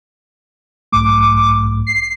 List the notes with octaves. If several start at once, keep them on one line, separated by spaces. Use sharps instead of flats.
B1 G#2 A3 D6
C7